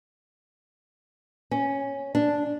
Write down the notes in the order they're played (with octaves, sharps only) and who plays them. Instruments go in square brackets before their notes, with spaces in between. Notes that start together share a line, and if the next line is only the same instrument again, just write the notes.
[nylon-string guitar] C#4
D4